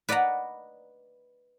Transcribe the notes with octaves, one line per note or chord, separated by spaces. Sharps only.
B4 D5 D#5 F#5 A#5